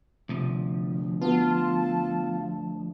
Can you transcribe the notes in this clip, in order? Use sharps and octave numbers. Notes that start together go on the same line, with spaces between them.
D2 C3 F3
B3 F4 F#4 A5